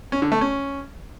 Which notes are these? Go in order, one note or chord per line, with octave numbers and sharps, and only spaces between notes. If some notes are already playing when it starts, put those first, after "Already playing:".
C#4
D3
A3
C#4